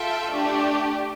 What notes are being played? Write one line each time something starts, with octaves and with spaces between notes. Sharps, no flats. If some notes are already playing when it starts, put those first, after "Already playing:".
Already playing: F4 A4 E5 G5
A3 D4 G4